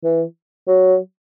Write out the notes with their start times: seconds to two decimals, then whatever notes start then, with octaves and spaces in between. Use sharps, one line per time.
0.04 E3
0.68 F#3